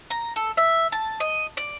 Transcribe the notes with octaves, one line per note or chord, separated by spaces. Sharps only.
A#5
A4
E5
A5
D#5
D5